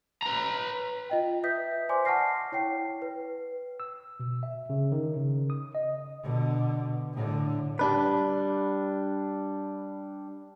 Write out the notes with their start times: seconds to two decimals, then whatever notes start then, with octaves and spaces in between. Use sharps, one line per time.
0.23 B4 A#5
1.10 F4 D#5 G5
1.43 B4 E5 D#6 G6 B6
1.89 C5 D5 G#5 C6 D6
2.05 F#5 A5 C#6 F6 A#6 C7
2.52 E4 C#5 G5 C7
3.02 B4
3.80 E6
4.20 B2
4.43 E5
4.70 C#3
4.92 D#3
5.16 C#3
5.50 D#6
5.75 D#5
6.23 B2 D3
7.14 A2 D3
7.79 G3 D4 B4